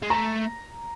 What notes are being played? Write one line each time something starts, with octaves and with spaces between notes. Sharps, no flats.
G#3
A3 A#5